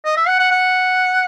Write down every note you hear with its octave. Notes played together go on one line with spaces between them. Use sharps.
D#5
E5
F#5
F#5
F#5